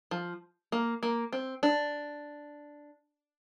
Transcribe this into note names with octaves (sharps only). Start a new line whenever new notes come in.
F3
A#3
A#3
C4
D4